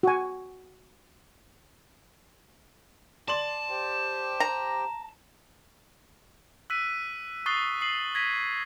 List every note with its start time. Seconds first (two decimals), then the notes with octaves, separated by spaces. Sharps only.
0.03 F#4 G#5
3.28 D5 A5 C6 F#7
3.70 G4 C5 G5
4.40 A#5
6.70 E6 F#6 B6 D#7
7.46 C#6 D#6 F#6 A6 C7 G7
7.81 D#6 C7 F#7
8.15 G#6 A#6 B6 D#7